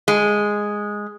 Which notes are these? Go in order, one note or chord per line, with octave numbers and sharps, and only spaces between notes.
G#3